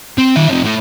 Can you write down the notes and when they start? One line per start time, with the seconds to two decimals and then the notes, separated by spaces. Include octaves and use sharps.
0.18 C4
0.36 D#3 E5
0.49 F2 C3
0.65 A2 A3